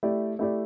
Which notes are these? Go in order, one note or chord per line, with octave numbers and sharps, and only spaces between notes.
A3 E4 G4 D5
A3 E4 G4 D5